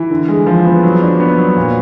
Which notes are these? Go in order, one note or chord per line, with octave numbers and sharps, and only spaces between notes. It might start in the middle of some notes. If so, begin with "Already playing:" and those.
Already playing: E3
D3
G#3
F3
B3
F#3
D4
B3
F#3
A#2